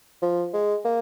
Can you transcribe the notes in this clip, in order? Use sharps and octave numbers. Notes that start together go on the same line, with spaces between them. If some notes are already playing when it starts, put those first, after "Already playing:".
F3
G#3
A#3